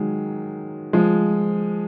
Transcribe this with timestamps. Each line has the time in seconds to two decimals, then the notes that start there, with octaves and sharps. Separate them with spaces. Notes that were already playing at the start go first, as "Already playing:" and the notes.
Already playing: D#3 F#3 G#3
0.93 F3 G#3